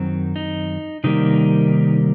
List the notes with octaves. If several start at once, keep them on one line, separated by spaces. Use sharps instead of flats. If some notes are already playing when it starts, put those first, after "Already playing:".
Already playing: F#2 D#3 F#3 C4
D#4
C3 D#3 G3 A#3 D#4